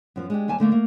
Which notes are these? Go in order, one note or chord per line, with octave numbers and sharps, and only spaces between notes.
F#2 F3 B3
G#3 D4 G4
D#2 G3 G#5 A5
D3 A3 A#3
A3 A#3